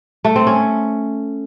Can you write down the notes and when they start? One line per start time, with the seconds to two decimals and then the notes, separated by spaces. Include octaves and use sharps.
0.24 A3
0.36 C4
0.47 C#4